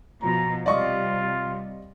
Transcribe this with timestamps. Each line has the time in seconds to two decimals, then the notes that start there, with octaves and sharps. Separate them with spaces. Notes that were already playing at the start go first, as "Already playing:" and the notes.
0.22 B2 F3 A#5
0.66 C3 G3 F4 D5 D#5 C#6